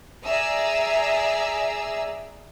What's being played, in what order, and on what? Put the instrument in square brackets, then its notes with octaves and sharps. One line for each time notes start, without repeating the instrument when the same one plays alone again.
[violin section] G#4 D5 E5 A#5 E6